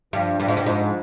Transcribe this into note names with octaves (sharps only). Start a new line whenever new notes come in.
G2 F3
G2
G#2
G2
G#2